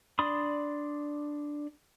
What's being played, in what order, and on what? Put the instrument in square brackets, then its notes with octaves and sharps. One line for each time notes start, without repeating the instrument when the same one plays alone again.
[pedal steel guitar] D4 D5 B5 C6 D#6